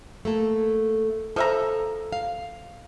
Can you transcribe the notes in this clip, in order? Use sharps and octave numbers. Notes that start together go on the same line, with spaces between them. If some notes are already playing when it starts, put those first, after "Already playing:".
A3 A#3 A4
F3 A4 E5 A#5
F5